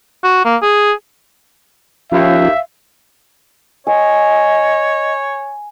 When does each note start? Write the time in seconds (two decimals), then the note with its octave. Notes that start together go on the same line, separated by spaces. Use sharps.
0.23 F#4
0.45 A#3
0.62 G#4
2.12 D#2 F3 C#4 F4 E5 F5
3.87 C#5 D#5 G#5